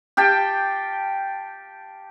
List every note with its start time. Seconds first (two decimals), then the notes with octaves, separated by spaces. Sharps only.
0.17 G4 F5 G5 A5